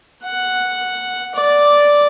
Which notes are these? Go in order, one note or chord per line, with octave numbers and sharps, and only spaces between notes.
F#5
D5